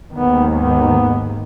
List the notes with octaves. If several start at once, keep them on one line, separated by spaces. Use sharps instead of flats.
D#2 G#2 D#3 B3
B3